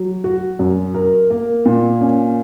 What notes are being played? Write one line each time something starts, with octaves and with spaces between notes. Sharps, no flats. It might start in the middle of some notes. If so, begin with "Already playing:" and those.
Already playing: F#3
F#4
F#2
A#4
A#3
A#2
C#4